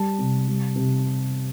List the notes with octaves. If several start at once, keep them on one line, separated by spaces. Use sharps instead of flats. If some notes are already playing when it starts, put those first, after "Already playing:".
Already playing: G3 A5
C3
G3
C3